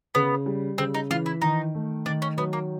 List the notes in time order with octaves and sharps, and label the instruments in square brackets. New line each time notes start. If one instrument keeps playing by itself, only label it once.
[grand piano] C#3 [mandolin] B3
[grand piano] G3
[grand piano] C#3 [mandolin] C4
[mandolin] D#4
[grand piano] E3 [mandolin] F4
[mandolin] E4
[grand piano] D#3 [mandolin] D#4
[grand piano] A3
[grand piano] D#3 [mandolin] D4
[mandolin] C#4
[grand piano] F#3 [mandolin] B3
[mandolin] A#3